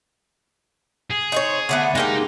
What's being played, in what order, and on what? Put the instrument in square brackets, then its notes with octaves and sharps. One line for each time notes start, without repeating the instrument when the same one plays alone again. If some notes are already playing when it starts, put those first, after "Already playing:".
[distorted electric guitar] G#4
[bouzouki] D#4 C5 C#5
D3 A3 B3
[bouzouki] G#3 A#3 G4 [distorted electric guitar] D#4